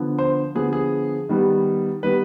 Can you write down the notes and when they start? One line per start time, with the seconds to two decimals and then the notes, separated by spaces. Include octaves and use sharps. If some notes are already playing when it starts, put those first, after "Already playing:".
Already playing: D3 F3 B3
0.19 C5
0.55 D3 F3 B3 G#4
0.73 G#4
1.29 D#3 G3 B3
2.03 D#3 G3 B3 B4